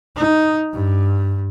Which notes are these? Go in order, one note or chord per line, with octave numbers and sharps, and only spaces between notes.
D#4
G2